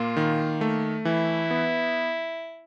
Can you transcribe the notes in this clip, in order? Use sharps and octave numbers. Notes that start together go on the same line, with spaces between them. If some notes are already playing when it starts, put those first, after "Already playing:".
Already playing: A#2 A#3 F4
D#3
A3
E3 E4
B3